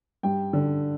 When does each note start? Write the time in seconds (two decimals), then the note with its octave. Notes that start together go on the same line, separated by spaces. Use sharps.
0.23 G2 G5
0.53 D3